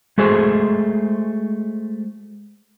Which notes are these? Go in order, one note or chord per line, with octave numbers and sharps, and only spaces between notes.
G#3 A3 F#4 G#4 C5